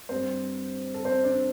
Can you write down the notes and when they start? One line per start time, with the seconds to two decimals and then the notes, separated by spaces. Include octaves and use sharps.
0.09 G2 G3 C4 C5
0.94 A4
1.05 C4 C5
1.24 D4 D5